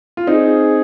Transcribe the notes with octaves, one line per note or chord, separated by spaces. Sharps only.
F4
C4 D#4 G#4